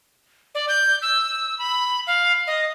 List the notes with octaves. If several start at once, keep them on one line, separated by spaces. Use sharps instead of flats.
D5
G6
E6
B5
F5
D#5